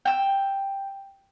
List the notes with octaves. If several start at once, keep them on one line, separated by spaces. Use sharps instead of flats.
G5 E6